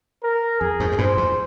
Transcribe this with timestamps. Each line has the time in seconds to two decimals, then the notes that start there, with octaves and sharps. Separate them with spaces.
0.23 A#4
0.60 F2 G#4
0.80 F2 G#2
0.92 G#2
0.98 G2 A#2 C5
1.17 F2 G#2